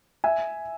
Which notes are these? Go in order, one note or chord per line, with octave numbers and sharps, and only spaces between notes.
E5 G#5